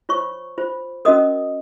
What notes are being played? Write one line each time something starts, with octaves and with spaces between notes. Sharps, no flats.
F4 C5 C#5 C#6
F4 C5
C#4 F#4 A#4 D#5 D#6